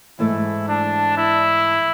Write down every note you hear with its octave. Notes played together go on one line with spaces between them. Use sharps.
G#2 E3 A3 E4
D4
E4